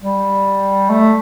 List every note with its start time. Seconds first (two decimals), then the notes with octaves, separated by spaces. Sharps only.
0.03 G3
0.90 A3